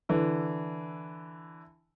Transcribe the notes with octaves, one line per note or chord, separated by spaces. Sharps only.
D3 E3